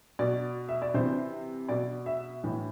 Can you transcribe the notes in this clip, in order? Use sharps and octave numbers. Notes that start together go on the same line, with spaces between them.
B2 D5
E5
D5
C3 E3 C5
B2 D5
E5
A2 E3